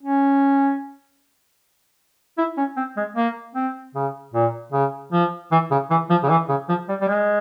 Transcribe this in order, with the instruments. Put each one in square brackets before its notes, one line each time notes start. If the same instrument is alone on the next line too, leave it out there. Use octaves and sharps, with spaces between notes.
[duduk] C#4
E4
C#4
C4
G#3
A#3
C4
C#3
A#2
C#3
F3
E3
C#3
E3
F3
C#3
E3
C#3
F3
G3
G3
G#3